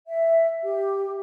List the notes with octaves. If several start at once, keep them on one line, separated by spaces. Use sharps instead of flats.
E5
G4